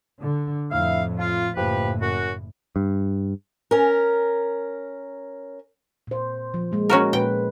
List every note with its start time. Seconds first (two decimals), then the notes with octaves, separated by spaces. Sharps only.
0.21 D3
0.71 F2 A2 E4 E5 F5
1.18 F4
1.56 F#1 A2 F3 G4 B4
2.01 F#2 F#4
2.76 G2
3.71 C#4 A#4
6.07 A#2 C5
6.54 F3
6.72 F3 G#3 A#3
6.89 C#4 F#4 A#4
7.13 A#2 G#3 B4 G5